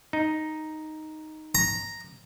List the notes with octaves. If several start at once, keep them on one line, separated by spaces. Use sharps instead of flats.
D#4
A#5